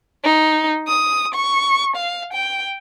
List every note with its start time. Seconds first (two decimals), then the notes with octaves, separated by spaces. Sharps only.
0.25 D#4
0.88 D#6
1.34 C#6
1.96 F5
2.33 G5